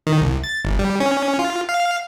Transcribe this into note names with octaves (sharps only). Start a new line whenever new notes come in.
D#3
C2
A6
G1
G3
C#4
F4
F5